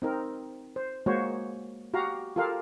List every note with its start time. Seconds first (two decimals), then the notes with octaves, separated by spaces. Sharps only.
0.02 C4 D#4 A#4
0.76 C5
1.06 G#3 A#3 F#4 C5 C#5
1.94 F#4 G4 F5 A#5
2.36 F4 G4 A4 A#4 F5